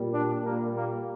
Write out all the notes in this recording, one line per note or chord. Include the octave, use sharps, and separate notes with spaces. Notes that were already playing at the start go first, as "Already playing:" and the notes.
Already playing: A#2 G3
D4
A#2 G3 A#3
A#3